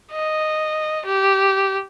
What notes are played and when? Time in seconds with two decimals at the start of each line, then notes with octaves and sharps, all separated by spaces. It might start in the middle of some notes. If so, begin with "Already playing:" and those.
0.12 D#5
1.06 G4